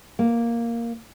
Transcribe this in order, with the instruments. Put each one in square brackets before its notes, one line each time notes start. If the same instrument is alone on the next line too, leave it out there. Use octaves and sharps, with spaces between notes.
[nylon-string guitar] A#3